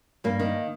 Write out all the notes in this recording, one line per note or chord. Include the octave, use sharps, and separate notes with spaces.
G2 A#3
D#3